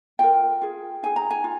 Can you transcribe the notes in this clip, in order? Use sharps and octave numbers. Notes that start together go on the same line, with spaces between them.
F4 A#4 G5
F4 G#4
D#4 G#4 G#5
A#5
G#5
F4